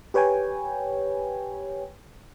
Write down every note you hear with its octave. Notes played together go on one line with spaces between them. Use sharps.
G4 B4 C#5 G5 G#5